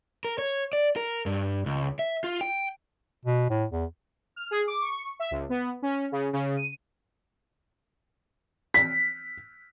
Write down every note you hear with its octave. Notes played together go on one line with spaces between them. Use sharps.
A#4
C#5
D5
A#4
G2
C#2
E5
F4
G5
B2
A2
E2
F6
G#4
D6
C#6
E5
C#2
B3
C#4
C#3
C#3
D#7
B6